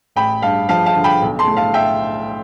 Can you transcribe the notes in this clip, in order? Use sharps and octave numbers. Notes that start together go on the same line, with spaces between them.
A1 G5 B5
G2 F5 A5
F3 F5 A5
F5 A5
D3
G5 B5
B1
A5 C6
A2
F5 A5
E5 G5